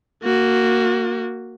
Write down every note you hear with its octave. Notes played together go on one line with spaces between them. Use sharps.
A#3 F#4